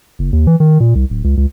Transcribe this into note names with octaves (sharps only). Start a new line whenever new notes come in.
F#1
D#2
E3
D#3
A#2
C2
D1
C#2
C#2